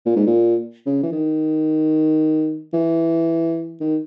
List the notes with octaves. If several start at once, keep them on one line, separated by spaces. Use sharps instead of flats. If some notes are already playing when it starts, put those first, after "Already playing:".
A#2
G#2
A#2
C#3
E3
D#3
E3
D#3